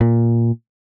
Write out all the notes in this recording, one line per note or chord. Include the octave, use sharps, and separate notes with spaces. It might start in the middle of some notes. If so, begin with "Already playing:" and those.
A#2